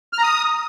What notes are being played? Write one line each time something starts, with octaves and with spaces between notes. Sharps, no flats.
F6
A#5
D#6